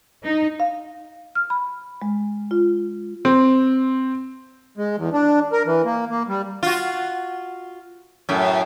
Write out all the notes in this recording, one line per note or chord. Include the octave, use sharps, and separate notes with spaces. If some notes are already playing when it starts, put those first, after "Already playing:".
D#4
F5
F6
B5
G#3
F4
C4
G#3
E2
D4
A#4
E3
A#3
A#3
G3
F4 F#4
F#2 A2